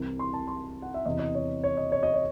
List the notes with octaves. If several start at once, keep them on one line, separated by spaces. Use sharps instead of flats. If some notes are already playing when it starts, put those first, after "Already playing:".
Already playing: C2 C3 E3
C6
A5
C6
F#5
E5
E2 C3 E3 D#5
D#5
C#5
C#5
D#5
C#5
D#5
C#5